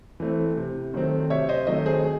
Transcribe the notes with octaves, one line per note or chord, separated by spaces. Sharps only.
E3 A3 C4
C3
D#3 F#3 A3 C4
C3 C#5 E5
C5 D#5
D#3 F#3 A3 C4 C5 D#5
G#4 C5
G#4